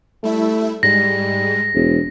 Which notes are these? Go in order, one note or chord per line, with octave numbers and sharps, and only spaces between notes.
G3 A3 E4 E5
G#2 G3 G#3 A#6
E1